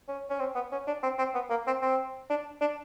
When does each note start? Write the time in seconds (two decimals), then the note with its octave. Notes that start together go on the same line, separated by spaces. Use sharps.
0.08 C#4
0.30 C#4
0.40 C4
0.55 B3
0.72 C#4
0.87 D4
1.03 C4
1.18 C4
1.34 B3
1.50 A#3
1.67 C4
1.82 C4
2.30 D4
2.61 D4